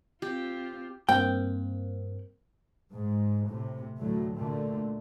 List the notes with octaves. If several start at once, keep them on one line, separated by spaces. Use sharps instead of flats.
C4 F4 G4
G2 A#3 C4 G5
G#2
A2 C3
D2 A2 F#3 A3
A#2 D3 A3